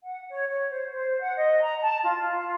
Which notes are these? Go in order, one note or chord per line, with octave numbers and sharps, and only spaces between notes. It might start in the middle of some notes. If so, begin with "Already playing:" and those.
F#5
C#5
C#5
C5
C5
F#5
D#5
A#5
A5
F4